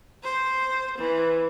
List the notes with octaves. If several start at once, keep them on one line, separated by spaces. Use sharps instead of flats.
C5
E3